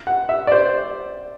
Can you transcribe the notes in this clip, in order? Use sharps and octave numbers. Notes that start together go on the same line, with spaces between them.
F#5
E5
D5
C5